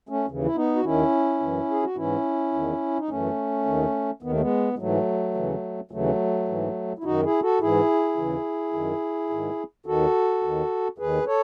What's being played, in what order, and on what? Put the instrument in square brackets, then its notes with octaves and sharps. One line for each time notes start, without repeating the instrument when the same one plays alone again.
[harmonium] A3 C#4
D#2 C#3 E3
E4
B3 D#4
F#4
D#2 D#3 C#4 E4
F#2 E3
G#4
F#4
G#2 E3 C#4 E4
E2 D#3
D#4
F#2 E3 A3 C#4
D#2 D#3
D#2 D#3 B3
A3
G#3 B3
G#3
G#2 E3 F#3 A3
D#2 C#3 E3
D#2 C#3 E3 F#3 A3
G#2 E3
E4
F#2 D#3 D#4 F#4
E4 G#4
F#4 A4
G#2 E3 E4 G#4
D#2 C#3 E3
F#2 D#3
G#2 D#3
D#2 D#3 F#4 A4
D#2 D#3
D#2 D#3 G#4 B4
A4 C#5